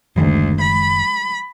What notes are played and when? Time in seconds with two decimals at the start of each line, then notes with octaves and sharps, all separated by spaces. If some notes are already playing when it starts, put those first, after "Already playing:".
0.16 F#1 D2 D#3 G#3
0.61 B5